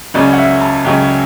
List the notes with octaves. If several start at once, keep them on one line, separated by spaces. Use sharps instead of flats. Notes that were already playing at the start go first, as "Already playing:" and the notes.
C#2 C#3 F#3 C#4 D5
F#5
E5
A5
C#2 C#3 F#3 C#4 G5